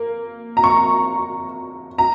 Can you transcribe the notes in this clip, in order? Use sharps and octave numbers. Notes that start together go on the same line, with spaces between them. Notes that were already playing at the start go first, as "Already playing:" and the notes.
Already playing: A#3
A#5
C#6
A#5